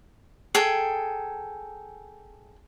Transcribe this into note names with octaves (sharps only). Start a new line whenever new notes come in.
G#4 A4 G5